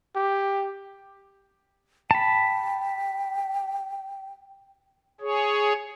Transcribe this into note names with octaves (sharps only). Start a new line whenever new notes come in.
G4
G5 A5 B5
G#4 C#5